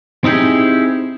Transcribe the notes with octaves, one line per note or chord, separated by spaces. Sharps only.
C4 D#4 E4 G4 G#4